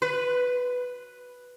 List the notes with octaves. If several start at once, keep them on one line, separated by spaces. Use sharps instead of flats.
B4